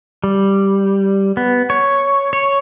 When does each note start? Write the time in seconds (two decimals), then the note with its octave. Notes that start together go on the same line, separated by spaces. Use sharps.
0.24 G3
1.37 B3
1.70 C#5
2.33 C#5